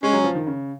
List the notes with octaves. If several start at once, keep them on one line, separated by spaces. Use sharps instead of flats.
G#3 C#4
F#3
F3
D#3
C#3